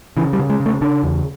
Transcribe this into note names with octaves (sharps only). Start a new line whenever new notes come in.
C#3 E3
G3
C#3
G#3
C#3
A3
C#3 D4
E2